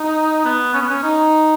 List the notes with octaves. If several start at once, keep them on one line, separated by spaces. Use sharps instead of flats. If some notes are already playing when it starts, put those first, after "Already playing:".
Already playing: D#4
B3
C#4
B3
C#4
D#4